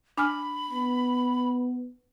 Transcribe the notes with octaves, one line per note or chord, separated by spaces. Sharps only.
D4 G#5 B5 F6
B3